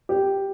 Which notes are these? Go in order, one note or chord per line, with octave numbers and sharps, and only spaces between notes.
G4